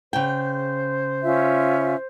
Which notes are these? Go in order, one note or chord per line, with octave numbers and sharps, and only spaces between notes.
C#3 C5 G5
C#4 F4 E5